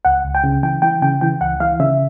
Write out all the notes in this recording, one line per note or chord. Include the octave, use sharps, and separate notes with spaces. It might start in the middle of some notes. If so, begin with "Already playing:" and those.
C#2 F#5
C#2
G5
C#3
E3 G5
E3 G5
C#3 G5
E3 G5
C#2 F#5
E3 F5
C#3 E5